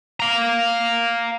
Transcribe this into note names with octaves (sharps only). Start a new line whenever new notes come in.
F5 A#5